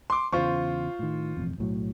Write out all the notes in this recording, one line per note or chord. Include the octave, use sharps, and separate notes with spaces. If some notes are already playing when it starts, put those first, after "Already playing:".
C6 D6
E2 C#3 F4 C5 C#6
A2 D#3
E1 A1 F2
B1 A2 F#3